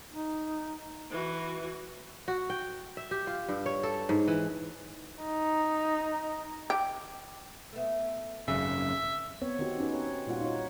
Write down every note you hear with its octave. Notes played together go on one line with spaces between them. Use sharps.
D#4
E3 F#4
F#4
G5
E5
G4
F4
G2
C#5
A4
G#2
E3
D#4
G4
A3 B3
G#1 F#2 C#3 E5
B3 C4 C#5
D#3 C4 D#4 F#4 G4
C#4 D#4 B4
C4 C#5
A#2 G3 F4 F#4 F#5
D#4 C#5